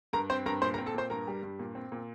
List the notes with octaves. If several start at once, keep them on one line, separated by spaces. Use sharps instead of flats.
G2 A#4 A#5
C4 C5 C6
G2 A#4 A#5
A#2 C5 C6
A#4 A#5
C4
A4 A5
A#2 C5 C6
G2 A#4 A#5
G3
G2
A#2
C4
A#2